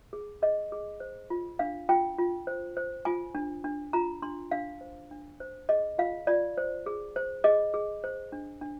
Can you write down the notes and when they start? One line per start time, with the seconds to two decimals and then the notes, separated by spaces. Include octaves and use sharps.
0.13 G#4
0.42 G#4 D#5
0.72 G#4
1.00 C5
1.30 F4
1.59 D4 F5
1.89 F4 G5
2.18 F4
2.47 C5
2.77 C5
3.05 F4 G#5
3.35 D4
3.64 D4
3.93 F4 A#5
4.22 D4 C6
4.51 D4 F5
4.81 C5
5.11 D4
5.40 C5
5.69 G#4 D#5
5.98 F4 F5
6.27 F4 D5
6.57 C5
6.86 G#4
7.16 C5
7.44 G#4 D#5
7.74 G#4
8.04 C5
8.32 D4
8.61 D4